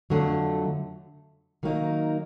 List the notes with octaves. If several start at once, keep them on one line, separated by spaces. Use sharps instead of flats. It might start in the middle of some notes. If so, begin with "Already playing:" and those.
F2 D3 F#3 A3
D#3 F#3 A#3 D#4